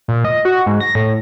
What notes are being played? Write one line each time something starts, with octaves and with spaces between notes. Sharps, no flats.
A#2
D#5
F#4
G#2
A#6
A2